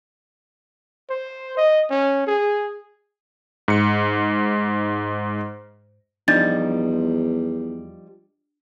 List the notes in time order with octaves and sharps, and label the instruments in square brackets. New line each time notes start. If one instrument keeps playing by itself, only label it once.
[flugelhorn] C5
D#5
C#4
G#4
[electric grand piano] G#2 C#7
[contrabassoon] E2 [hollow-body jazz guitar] F3 G3 D#4 [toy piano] D4 D6 [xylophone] A6